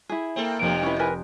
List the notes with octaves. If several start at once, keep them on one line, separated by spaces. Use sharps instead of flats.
E4 G#4
A#3 C4 A4
F1 F2 C3 D7
C#4 E4 B4
A#4 B4 G#5